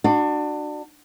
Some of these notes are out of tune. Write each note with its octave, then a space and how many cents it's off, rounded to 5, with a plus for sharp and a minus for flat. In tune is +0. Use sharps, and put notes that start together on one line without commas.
D4 +25 F#4 +0